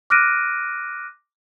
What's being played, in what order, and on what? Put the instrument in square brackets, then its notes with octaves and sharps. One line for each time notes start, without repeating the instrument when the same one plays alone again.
[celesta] D6 F6 F#6 A#6 D7 D#7